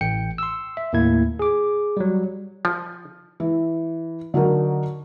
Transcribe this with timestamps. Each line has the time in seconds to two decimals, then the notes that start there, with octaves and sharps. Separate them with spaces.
0.01 A1 G5 C#7
0.38 C6 E6
0.77 E5
0.93 D#2 A2 A#3 E4 G#6
1.39 G#4 D6
1.97 F#3 G3
2.65 F3
3.40 E3
4.34 D3 F#3 D#4 A#4